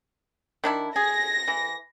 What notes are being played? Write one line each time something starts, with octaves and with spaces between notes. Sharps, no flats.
D#3 D4 E4
G#4 A#6
E3